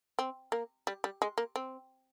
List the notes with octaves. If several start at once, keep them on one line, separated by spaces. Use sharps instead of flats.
C4
A#3
G3
G3
G#3
A#3
C4